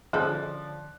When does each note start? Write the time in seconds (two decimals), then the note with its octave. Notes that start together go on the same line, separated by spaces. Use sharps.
0.13 D3 F3 G#3 C#4 A4 D5 F#6